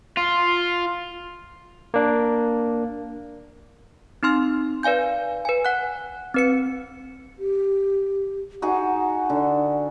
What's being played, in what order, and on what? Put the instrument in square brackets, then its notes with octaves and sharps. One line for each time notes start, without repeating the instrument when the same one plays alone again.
[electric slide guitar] F4
[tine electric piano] A#3 D4
[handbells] C4 D#4 C6 F6
B4 D5 F5 G#5 G6
B4 G#5
F#5 F#6
C4 B4 C#7
[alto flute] G4
[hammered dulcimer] D#4 F#4 G#4 [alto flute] F#5
[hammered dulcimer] D3